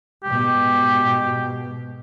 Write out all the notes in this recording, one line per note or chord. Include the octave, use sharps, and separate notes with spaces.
G#2 B2 G4